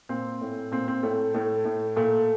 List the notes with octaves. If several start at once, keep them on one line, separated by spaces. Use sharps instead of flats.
A#2 C4
A2
A#2 C4
C4
A2 A3
A2 A3
A2
A#2 A3